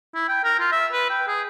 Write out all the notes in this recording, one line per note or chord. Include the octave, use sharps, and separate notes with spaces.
E4
G5
A#4
F4
E5
B4
G5
G#4